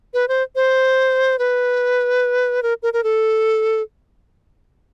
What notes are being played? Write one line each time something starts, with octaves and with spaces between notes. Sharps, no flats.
B4
C5
C5
B4
A#4
A#4
A#4
A4